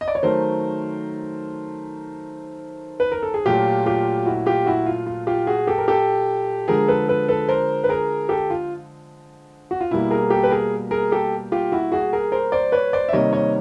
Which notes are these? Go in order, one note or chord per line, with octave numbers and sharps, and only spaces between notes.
D#5
D5
C#5
D#3 F#3 A3 A#4 C5
B4
A#4
A4
G#4
A#2 F#3 A3 F4 G4
F4 G4
E4 F#4
F4 G4
E4 F#4
F4
F4
F4 G4
F#4 G#4
G4 A4
A#4
G4 A4
D3 F3 G#3 G#4 A#4
A4 B4
A4 B4
A4 B4
A#4 C5
B4
G#4 A#4
G4 A4
F4
F#4
F4
B2 G3 A#3 E4
G#4 A#4
G4 A4
B4
G#4 A#4
G#4 A#4
G4 A4
F4 G4
E4 F#4
F#4 G#4
G#4 A#4
A#4 C5
C5 D5
B4 C#5
C5 D5
E5
C3 D#3 G3 A#3 C#5 D#5
C#5 D#5